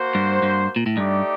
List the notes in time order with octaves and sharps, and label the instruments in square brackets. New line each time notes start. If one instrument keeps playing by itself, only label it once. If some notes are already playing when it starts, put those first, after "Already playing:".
Already playing: [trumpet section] A#3 F#4 C5
[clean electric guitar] G2
G2
A#2
A2
[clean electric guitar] G2 [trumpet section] A3 D#4 G4 D5